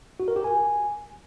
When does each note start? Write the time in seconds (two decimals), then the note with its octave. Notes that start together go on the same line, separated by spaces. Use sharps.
0.20 F#4
0.28 A#4
0.36 G4
0.44 G#5